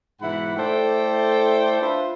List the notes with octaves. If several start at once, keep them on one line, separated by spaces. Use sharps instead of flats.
G#2 B2 E3 E4 F#5 B5
A3 E4 A4 C5 D5 G5
D4 F4 B4 C5 E5